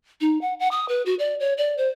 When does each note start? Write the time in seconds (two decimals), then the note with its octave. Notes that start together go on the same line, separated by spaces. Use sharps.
0.21 D#4
0.41 F#5
0.60 F#5
0.71 D#6
0.89 B4
1.06 F#4
1.19 D5
1.40 C#5
1.58 D5
1.78 C5